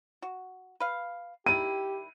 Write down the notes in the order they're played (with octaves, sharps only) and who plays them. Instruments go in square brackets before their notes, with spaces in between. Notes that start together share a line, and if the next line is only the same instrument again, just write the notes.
[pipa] F#4
B4 F5
[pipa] D#3 G3 E4 [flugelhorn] G4 [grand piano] D#7